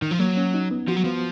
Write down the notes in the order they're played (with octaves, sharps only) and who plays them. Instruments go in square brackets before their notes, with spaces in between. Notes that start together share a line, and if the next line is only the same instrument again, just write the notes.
[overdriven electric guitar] D#3
F3
[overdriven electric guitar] F#3 [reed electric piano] A#3
[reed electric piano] C#4
D#4
B3
[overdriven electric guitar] F3 [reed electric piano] F#4
[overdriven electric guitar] F#3
[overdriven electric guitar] F3 [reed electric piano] B3